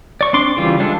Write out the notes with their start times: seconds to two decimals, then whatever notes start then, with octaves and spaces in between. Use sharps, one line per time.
0.21 D5 C#6
0.33 C4 D4 C6 D6
0.57 C#3 E3 G3 F4
0.80 G3 G#3 D4 F4 A4